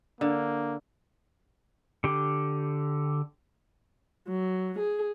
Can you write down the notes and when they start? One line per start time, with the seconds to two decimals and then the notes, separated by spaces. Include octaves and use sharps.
0.21 D3 A#3
2.04 D3 G4
4.28 F#3
4.79 G#4